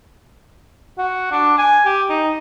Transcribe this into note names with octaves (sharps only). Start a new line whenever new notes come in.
F#4
D4
G#5
G4
D#4